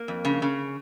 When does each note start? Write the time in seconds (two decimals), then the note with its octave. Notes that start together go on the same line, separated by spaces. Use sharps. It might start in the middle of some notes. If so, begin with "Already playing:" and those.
Already playing: A#3
0.08 F2
0.25 C#3
0.42 C#3